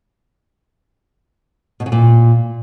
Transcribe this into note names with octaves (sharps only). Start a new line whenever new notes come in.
B2
C#3
A#2